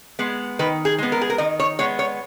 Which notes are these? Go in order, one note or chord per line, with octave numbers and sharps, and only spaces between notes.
G#3 B3
D#3 B4
G#4
G#3 B3
A#4
G#4
A#4
D#3 D#5
C#5
G#3 B3 C#5
C#5